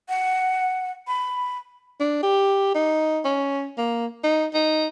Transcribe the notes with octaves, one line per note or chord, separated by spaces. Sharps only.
F#5
B5
D4
G4
D#4
C#4
A#3
D#4
D#4